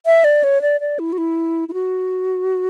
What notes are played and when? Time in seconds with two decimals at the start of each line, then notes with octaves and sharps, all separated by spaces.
0.06 E5
0.24 D5
0.44 C#5
0.62 D5
0.80 D5
0.99 E4
1.13 F#4
1.18 E4
1.68 E4
1.74 F#4